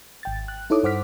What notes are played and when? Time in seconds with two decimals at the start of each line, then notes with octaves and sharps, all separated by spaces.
0.23 G#1 G5 A6
0.48 F#6
0.70 D#4 E4 A4 C#5 D6 D#6
0.83 G2 C5 F#5 D6 F6 B6